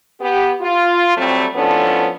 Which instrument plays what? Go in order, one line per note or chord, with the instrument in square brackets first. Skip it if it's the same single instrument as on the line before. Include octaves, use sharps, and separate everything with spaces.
[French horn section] B3 G4
F4
F#3 G3 A3 C4
A2 F3 B3 C#4 D4 A4